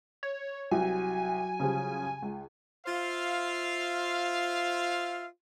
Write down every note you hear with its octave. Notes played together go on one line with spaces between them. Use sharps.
C#5
C2 F#3 G#5
C#3 F3 G3
C#2
F4 C5 E5 F5